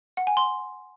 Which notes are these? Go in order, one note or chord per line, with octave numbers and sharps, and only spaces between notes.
F#5
G#5
C6